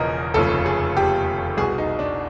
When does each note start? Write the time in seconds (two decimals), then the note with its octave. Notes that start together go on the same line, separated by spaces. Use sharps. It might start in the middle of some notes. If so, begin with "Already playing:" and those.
Already playing: E1 E2 C#3 F3 A#4 D#5
0.34 F1 D#2 C#3 F3 A4
0.66 G#4
0.97 G4
1.57 C2 B2 G#4
1.78 D#4
1.99 D4